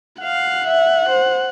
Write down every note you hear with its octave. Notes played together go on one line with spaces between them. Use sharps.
F5 F#5
E5
C5